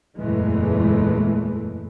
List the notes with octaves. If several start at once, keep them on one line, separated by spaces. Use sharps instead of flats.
F#1 E2 A#2 E3 G#3 A3